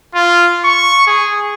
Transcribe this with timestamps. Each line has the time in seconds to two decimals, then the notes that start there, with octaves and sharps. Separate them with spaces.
0.15 F4
0.65 C#6
1.07 G#4